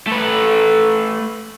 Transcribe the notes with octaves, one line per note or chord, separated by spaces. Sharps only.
A3 B4